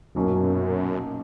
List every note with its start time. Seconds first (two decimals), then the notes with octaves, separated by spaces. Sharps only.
0.15 B1 F#2 A#2 F#3 A#3 C#4